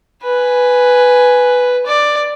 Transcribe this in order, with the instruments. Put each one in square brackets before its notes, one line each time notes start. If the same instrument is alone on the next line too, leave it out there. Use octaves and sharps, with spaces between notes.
[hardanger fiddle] B4 G#5
D5